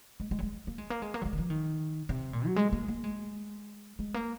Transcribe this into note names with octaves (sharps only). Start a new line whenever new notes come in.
G#3
G#3
F#3
G#3
A#3
G#3
A#3
G#3
A#3
F#3
G#3
D#3
F3
D#3
C3
A#2
F#3
G#3
A#3
A#3
G#3
G#3
A#3